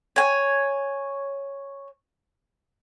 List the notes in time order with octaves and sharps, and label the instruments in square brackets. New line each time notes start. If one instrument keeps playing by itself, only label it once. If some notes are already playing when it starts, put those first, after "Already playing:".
[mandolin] C#5 G#5